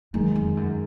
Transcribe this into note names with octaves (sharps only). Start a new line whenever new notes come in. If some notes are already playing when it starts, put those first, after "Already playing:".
F#2 D#3 G#3 D#4
F2
F#2